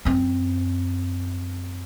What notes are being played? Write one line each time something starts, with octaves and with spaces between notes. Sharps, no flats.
F#2 C4